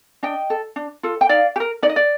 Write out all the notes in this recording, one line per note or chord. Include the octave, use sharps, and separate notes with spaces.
D4 D#5 G5
A4
D4
F4 A4
G5
D#4 D5 F5
G4
A#4
D#4 D5
D#5
D5